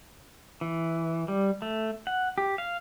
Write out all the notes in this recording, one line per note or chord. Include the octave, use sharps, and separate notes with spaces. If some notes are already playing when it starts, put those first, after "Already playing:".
E3
G3
A3
F#5
G4
F5